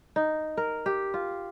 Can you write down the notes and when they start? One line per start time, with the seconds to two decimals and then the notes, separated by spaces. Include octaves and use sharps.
0.16 D#4
0.57 A#4
0.86 G4
1.14 F4